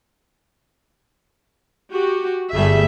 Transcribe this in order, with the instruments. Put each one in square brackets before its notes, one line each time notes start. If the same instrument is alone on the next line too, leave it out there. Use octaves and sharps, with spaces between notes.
[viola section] F#4 G4
[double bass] G1 G3 [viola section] A3 G#4 E5